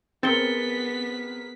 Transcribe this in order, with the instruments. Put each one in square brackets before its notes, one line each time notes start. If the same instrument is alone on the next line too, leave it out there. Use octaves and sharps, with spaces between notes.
[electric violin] B3 B6 [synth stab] C4 [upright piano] G#4 A#4 [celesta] A6 C#7 G7